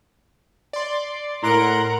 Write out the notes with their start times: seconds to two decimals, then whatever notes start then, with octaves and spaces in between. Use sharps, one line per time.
0.73 D5 C6
1.43 A2 E4 A#4 F#5 A#5 C6 F#6 D7